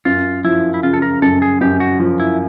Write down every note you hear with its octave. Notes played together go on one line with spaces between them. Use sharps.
F#2 F4
F3 E4
E4
C#3 F4
A4
A#4
F#2 A4
G#4
F#2 G4
F#4
F3
E4